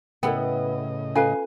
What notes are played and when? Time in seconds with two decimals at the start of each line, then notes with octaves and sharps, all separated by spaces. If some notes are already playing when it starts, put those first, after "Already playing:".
0.23 A2 C#3 B3 E4 A4 D#5 G5
1.15 C#4 F4 A4 B4 F5 G#5